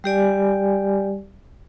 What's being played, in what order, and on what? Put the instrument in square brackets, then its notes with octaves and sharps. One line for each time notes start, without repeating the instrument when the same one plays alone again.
[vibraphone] G3 G4 D5 G#5